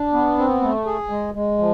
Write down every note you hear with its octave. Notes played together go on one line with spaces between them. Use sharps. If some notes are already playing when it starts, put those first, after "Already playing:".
Already playing: D4
B3
C4
A3
G#4
G#3
G#3
F3